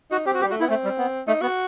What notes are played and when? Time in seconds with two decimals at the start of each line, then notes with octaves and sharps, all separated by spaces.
0.11 D#4 F#4
0.26 C4 G4
0.34 F#4
0.41 G4
0.44 G3
0.50 A3 F#4
0.60 B3 E4
0.69 A3 C4
0.84 G3
0.98 B3
1.28 A3 D#4
1.42 B3 F#4